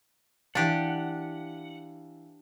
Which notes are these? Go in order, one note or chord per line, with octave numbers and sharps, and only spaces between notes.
E3 D4 G4 F5 F#5